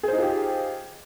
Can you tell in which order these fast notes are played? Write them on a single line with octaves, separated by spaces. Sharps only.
G#4 C5 D#4 F4 G4